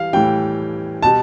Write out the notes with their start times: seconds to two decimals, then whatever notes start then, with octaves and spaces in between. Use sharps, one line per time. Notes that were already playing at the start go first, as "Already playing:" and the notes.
Already playing: E3 G3 F5
0.13 A2 E3 G3 G5
1.03 B2 G3 A5